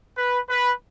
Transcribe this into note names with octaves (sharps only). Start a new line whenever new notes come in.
B4
B4